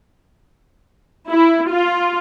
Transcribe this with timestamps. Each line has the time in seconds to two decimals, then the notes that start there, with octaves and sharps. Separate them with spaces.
1.30 E4
1.69 F4